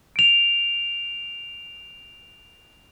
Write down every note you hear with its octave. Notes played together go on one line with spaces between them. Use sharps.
D7 F7